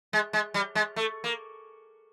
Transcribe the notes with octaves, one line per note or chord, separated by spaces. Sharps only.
G#3
G#3
G3
G#3
A3
A#3